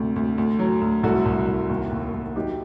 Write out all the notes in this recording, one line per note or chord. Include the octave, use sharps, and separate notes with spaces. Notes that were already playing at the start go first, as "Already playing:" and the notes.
Already playing: D2 C3
D2
D2
F#3
D2
C2 F#4 A4
C2
C2
D#2
D#2
D#2
F#3 D#4 G4